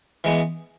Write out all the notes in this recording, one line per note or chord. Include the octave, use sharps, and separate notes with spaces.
E3 G#3 B3